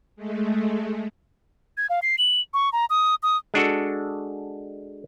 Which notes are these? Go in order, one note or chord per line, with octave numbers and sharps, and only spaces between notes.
G#3 A3
G#6
F5
C7
F#7
C#6
A#5
D#6
D#6
G#3 D4 F#4 A4